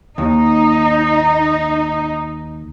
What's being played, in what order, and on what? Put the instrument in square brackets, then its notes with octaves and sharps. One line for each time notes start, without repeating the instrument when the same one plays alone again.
[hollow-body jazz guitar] D#2 [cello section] D#4